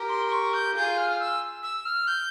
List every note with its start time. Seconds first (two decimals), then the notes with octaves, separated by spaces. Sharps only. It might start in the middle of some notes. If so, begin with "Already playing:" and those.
Already playing: G4 A#4
0.09 C6
0.25 C6
0.32 C#6
0.53 G6
0.75 F4 G#4 G6
0.98 F6
1.20 E6
1.63 E6
1.85 F6
2.08 G6